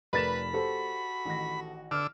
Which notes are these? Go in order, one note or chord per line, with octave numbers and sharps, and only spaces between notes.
F1 A3 A#4 B4 D5 B5 A6 E7
F#4 G4 A4 C5
A1 D#3 A#6
D3 D6 E6 F6